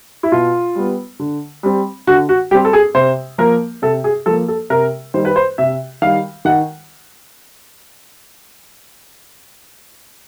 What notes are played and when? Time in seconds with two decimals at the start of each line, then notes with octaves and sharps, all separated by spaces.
0.23 E4
0.32 B2 F4
0.76 G3 B3
1.20 D3
1.63 G3 C4
2.07 D3 F#4
2.29 F#4
2.51 G3 C4 G4
2.65 A4
2.73 G#4
2.95 C3 C5
3.38 F3 A#3 A#4
3.82 C3 A4
4.04 G#4
4.26 F3 A#3 A4
4.48 A4
4.70 C3 A#4
5.14 D#3 G3 C5
5.25 B4
5.36 C5
5.58 C3 E5
6.02 D#3 G3 F5
6.45 D#3 F#5